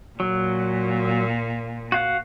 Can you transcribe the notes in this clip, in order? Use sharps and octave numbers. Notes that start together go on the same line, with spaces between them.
A#2 F#3
F#4 F5 F#5